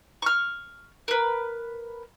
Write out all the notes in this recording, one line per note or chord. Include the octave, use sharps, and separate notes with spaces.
C#6 F6
A#4 B4